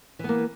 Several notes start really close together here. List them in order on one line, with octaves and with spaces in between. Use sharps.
E3 B3 A#3